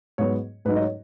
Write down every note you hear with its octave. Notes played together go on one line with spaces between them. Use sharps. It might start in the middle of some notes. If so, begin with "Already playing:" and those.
G#2 F#3 B3 C#5
G#2 F#3 D#4 B4
D#5
C#5